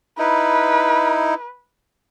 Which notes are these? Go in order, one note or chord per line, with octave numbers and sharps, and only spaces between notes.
D#4 E4 B4